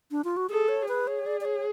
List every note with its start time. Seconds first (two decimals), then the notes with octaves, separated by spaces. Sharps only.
0.11 D4
0.25 F4
0.37 F#4
0.50 G#4 A4
0.68 C#5
0.88 G#4 B4
1.07 C#5
1.26 D5
1.41 D5
1.45 C#5